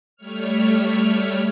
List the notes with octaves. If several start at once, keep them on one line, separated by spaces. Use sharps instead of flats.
G3 A3 C#5 F6